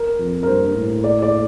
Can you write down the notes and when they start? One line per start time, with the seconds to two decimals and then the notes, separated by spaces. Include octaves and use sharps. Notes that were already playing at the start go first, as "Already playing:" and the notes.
Already playing: A#4
0.19 F2
0.43 A#4
0.47 G2 C5
0.75 A2
1.04 D5
1.22 D5